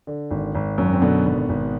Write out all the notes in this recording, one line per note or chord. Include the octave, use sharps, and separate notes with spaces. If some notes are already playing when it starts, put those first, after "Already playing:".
D3
G#1
G#1
F#2
C4
B2 D3 B3
G#1
G#1